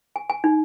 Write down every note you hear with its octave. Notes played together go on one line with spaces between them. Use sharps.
G#5
G#5
D#4